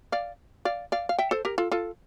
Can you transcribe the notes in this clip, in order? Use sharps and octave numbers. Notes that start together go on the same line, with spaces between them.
D5 F5
D5 F5
D5 F5
F5
E5 G5
A4 C5
G4 A#4
F4 A4
F4 A4